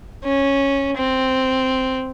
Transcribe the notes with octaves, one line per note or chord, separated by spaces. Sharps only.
C#4
C4